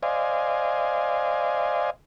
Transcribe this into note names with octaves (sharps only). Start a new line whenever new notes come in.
C5 D5 D#5 F5 G#5